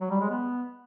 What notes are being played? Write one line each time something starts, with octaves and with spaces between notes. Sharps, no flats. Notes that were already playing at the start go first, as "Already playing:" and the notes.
F#3
G3
G#3
B3